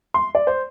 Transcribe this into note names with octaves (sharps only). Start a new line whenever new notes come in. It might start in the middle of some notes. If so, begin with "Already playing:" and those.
C6
D5
C5